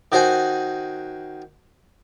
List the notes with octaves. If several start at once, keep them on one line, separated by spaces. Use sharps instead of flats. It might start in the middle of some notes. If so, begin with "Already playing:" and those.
D#3 F#4 C5 F#5 G#5